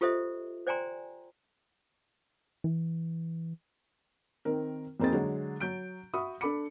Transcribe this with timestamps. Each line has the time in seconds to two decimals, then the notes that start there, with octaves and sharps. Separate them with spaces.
0.01 F4 G4 A4 C5 D#5 E5
0.66 C5 D5 G5 G#5 A#5 C6
2.64 E3
4.45 D#3 C4 A#4
5.00 F2 A#3 C4 D#4 G#4 A6
5.12 D3 F#3 G#3
5.60 F#3 G6 D7
6.14 F#4 E5 B5 C#6 D#6
6.41 D4 A4 B5 D6 C#7